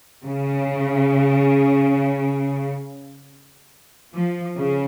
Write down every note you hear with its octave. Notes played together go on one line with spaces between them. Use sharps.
C#3
F3
C#3